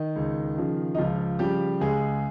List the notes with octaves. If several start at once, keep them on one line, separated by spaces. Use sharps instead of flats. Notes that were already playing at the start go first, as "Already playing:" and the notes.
Already playing: D#3 D#4
C#2
C#3 F3
D#4
C#2 F3 F4
C#3 F3 G3 G4
C#2 G#3 G#4